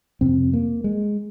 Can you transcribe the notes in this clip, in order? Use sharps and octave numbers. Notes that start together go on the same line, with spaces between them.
F2 C3 C4
A#3
G#3